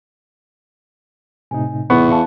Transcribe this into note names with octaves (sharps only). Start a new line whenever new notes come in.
A2 C3 D#4 G#5
E2 B3 C#6
E4 F5 A5 C#6